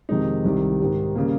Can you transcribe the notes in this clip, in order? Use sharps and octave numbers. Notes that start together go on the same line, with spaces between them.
F2 C3 D#3 G#3 D#4
C2 C3 D#3 G3
G#2 D#3 G3
C#3 G3 A#3